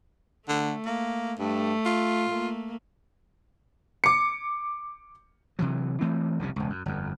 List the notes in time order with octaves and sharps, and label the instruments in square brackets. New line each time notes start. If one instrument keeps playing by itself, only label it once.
[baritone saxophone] D3 [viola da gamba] A3
[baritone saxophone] A#3
[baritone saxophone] G2 [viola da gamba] A3
[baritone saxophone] F4
[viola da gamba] A3 A#3
[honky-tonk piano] D6 C#7
[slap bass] C3 E3 F#3
E3 A3 C4
F1 C2 C#3 G3
E1 C#2
F#2
G1 F2